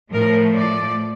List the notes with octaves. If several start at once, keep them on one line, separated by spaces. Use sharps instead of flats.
A2 F3 A3 A#4
D5